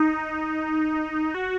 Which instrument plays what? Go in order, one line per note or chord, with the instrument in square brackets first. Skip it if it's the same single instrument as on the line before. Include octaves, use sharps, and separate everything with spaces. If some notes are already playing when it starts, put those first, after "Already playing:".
Already playing: [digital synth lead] D#4
F#4